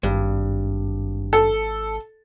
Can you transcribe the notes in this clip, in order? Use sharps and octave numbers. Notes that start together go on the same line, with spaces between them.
G#1 G2
A4